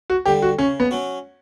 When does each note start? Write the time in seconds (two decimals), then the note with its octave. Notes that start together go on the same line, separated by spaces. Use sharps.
0.10 F#4
0.25 D3 G3 G4
0.42 F#4
0.58 C#3 C#4
0.80 B3
0.91 F#3 C#4 F#4